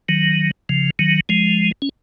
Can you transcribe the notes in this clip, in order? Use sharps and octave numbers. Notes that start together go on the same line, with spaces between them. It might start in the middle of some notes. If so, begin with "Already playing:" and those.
D#3 F#3
C#3 F3
D#3 F#3
F3 G#3
C#4